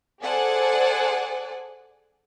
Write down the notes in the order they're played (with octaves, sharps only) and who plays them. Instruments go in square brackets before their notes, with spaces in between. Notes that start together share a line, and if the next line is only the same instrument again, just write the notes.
[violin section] G#4 A4 C5 D5 F#5 G#5